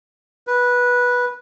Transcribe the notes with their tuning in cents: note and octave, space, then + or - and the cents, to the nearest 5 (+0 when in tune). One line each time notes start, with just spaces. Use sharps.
B4 -10